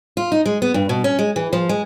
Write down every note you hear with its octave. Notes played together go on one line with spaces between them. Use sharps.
F4
D#4
G#3
B3
G2
B2
C#4
G#3
E3
F3
G#3